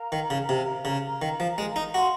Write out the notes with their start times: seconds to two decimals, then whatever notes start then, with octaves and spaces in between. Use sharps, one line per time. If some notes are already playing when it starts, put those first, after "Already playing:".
Already playing: A#4 F5 A#5
0.12 D#3
0.30 C#3
0.49 C3
0.85 C#3
1.22 D#3
1.40 F3
1.58 G#3
1.76 D#4
1.94 F#4 A#4 F5 C6